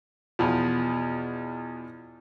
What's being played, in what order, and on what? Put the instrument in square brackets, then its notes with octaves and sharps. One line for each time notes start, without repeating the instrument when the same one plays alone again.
[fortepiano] E2 B2 F3